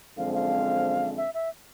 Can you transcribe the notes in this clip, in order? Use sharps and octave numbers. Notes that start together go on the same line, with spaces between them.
F#2 D3 F3 G#3 C4 F5
F5
E5
E5